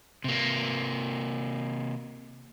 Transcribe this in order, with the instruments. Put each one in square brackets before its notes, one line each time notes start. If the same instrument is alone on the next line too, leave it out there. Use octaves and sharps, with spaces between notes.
[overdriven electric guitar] C3 A#3